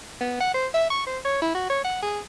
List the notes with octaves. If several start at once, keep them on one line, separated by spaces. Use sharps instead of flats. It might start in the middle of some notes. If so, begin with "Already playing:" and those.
B3
F#5
C5
E5
C#6
C5
C#5
E4
F#4
C#5
F#5
G#4